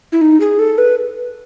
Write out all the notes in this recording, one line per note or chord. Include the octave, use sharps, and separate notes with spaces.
E4
D#4
G#4
A4
B4